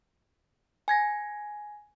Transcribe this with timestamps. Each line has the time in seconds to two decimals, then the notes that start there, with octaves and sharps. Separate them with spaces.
0.88 G#5 G#6 A#6